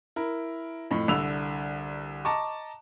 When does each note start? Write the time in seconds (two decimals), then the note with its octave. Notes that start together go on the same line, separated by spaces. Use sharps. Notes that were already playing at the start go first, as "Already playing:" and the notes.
0.16 E4 A#4
0.91 F2 A2
1.08 C2 D3 E6 F7
2.25 D#5 A5 A#5 C#6 D6